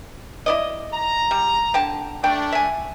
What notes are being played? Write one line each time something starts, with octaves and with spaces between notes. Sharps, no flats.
E4 D5 D#5
A#5
G3
D3 G5 A5
A3 D4 G5
E5 G#5